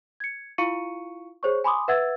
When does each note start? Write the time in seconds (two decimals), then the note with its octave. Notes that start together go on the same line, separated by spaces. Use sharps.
0.20 G#6 C#7
0.58 E4 F4 F5 C#6 C#7 D#7
1.43 G#4 C5 C#5 C#6
1.64 G#5 B5 C6 D6 D#6
1.88 B4 E5 F#5 E6 G#6 A6